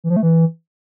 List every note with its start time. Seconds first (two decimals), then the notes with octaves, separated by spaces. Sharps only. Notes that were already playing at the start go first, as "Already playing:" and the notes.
0.04 E3
0.10 F3
0.16 A3
0.23 E3